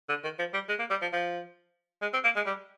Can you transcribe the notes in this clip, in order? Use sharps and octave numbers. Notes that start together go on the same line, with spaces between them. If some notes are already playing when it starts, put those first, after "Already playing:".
D3
D#3
F3
G3
G#3
A#3
G3
F3
F3
G#3
C4
A#3
G#3
G3